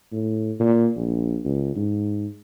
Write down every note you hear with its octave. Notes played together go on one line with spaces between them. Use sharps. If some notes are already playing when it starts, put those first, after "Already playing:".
A2
A#2
A#1
C#2
G#2